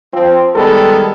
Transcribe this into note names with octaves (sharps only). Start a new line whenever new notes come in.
F3 C4
D#3 G3 G#3 B3 A4